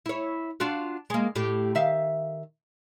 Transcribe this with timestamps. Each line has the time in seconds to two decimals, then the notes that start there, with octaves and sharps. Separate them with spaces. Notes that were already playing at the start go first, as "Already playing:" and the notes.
0.06 E4 C#5
0.60 D4 F4 F#4
1.10 G#3 A#3
1.36 A2 G4
1.75 D#3 E5 F5